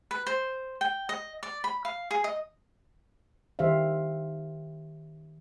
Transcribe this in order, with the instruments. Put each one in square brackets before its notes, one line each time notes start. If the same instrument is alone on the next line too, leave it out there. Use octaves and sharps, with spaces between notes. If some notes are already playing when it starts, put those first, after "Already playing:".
[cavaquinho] B4
C5
G5
D#5
D5
B5
F5
G#4
D#5
[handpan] D#3 G4 C5 E5 F5